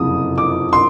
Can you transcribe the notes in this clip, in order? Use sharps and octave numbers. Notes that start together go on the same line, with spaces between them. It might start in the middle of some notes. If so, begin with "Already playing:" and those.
Already playing: F#1 F2 C3 D#6
D6
C6